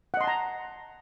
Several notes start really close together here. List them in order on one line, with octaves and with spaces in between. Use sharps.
F#5 D#5 C6 A5 A#5